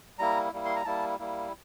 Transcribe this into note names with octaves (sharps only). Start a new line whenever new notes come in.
G3 A#3 E4 A#5
G3 A#3 E4
C6
A#5
G3 A#3 E4 A5
G3 A#3 E4